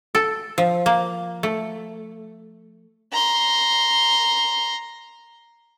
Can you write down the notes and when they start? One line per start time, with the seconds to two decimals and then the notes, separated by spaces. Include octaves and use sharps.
0.15 A4
0.58 F3
0.86 A#3
1.43 A3
3.12 A#5 C6